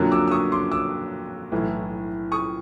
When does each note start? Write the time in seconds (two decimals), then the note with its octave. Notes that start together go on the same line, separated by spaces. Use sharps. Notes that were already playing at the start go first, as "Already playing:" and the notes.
Already playing: F2 D3 F#3 A#3
0.12 D6 E6
0.28 E6
0.31 C#6 D#6
0.52 C6 D6
0.71 D6 E6
1.52 B1 A2 E3 A3
2.32 C#6 D#6